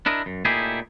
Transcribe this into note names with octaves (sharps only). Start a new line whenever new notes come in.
D4 E4 A#4 D#5
F#2
A#2 A3 D#4 E4 G4 G#4